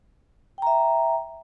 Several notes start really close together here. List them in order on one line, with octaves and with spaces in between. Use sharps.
G5 A#5 E5